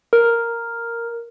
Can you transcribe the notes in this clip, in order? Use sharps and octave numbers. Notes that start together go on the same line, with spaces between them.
A#4